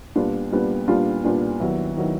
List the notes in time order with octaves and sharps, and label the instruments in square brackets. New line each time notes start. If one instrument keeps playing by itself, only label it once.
[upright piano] A#2 G3 B3 D4 F4
A#2 G3 B3 D4 F4
A#2 G3 B3 D4 F4
A#2 G3 B3 D4 F4
D#2 D#3 F#3 B3 E4
D#3 F#3 B3 E4